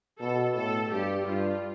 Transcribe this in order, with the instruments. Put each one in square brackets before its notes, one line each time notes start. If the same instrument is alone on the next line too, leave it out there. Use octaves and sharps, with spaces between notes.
[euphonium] B2 [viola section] A4
[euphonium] A2 [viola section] A4
[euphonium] G2 [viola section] G4
[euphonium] G2 [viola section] F4